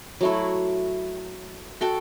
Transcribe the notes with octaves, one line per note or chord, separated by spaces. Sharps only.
F#3 A3 E4
F#4 A4 G5 A5